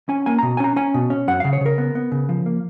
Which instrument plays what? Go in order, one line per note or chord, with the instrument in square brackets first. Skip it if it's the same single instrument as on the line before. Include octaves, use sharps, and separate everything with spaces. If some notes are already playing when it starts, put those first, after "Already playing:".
[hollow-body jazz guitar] C#4 G#5
A#3 G#5
A#5
B2
G#5
C#4 A#5
C#4 G#5
B2
C#4
F#2 F#5
F5
C#3
C#5
C#3 A#4
B3
B3
C#3
F3
A#3